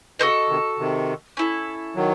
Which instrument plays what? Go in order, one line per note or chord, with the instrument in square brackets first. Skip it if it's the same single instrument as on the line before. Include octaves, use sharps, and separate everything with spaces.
[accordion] C#3 [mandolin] F#4 A4 C5 D#5
[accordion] C3 D#3
C3 D#3
[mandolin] C#4 E4 A4
[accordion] D#3 F#3